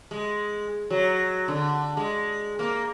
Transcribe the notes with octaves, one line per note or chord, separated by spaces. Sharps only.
G#3
F#3
D3
G#3
A#3